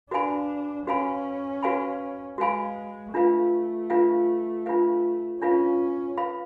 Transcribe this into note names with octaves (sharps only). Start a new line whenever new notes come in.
D4 F#4 B4 F5 G#5 B5
C#4 F#4 B4 F5 G#5 B5
F#4 B4 F5 G#5 B5
G#3 F#4 B4 F5 G#5 B5
A3 D4 F4 B4 F5
D4 F4 B4 F5
D4 F4 B4 F5
C#4 D4 F4 B4 F5
B4 F5 B5